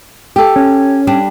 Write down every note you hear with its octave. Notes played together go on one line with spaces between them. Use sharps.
G4 A4
C#4
G3 D4